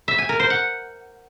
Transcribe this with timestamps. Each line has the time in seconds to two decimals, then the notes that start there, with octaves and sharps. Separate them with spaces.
0.08 E5
0.18 G#5
0.29 A#4
0.40 C5
0.50 F#5